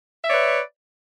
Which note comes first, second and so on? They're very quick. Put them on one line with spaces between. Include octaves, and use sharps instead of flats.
E5 D5 C#5 B4